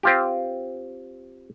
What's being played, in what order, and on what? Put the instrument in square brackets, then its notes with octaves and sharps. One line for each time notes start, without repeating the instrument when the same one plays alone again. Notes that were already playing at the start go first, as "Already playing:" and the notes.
[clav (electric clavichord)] C4 F4 G4